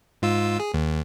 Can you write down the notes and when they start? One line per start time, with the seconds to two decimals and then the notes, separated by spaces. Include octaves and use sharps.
0.22 G#2 F4 E6
0.60 G#4
0.74 D#2